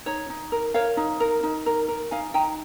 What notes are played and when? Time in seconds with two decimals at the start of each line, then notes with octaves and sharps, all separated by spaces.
0.06 D#4 C#5
0.30 D#4
0.52 A#4
0.74 A#4 C#5 F5
0.97 D#4
1.20 A#4
1.43 D#4
1.66 A#4
1.88 A#4
2.11 D#4 F5 G#5
2.34 D#4 G5 A#5